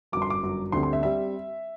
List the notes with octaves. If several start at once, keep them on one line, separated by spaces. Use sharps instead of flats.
G1 F#2 F#3 D6
C6
D6
G1 F#2 F#3
D2 D3 G3 C4 C6
C6
E5
G3 C4 E5